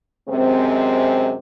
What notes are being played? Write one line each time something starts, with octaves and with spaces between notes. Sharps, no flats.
F#2 C3 G#3 C4